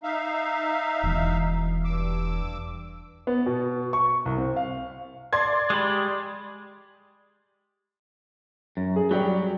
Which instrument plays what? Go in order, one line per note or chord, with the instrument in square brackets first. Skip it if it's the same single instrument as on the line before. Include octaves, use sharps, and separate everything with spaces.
[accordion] D#4 E5 F5
[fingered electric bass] E1 E3
[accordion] G2 D6 E6
[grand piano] B3
B2
C#6
C2
C4
F5
[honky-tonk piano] D5 C6 G#6
[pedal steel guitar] G#3 G4 B5
[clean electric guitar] F#2
[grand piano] G#4
[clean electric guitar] F#3 [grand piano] G3 G4 D5